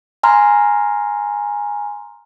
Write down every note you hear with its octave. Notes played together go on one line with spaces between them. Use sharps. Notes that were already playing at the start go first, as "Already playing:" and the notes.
G#5 A#5 C6 F6